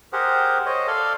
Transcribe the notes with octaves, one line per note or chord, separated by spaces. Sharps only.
G4 G#4 A#4 C5 F#5
C5 C#5 D#5
A4 D5 F5 C6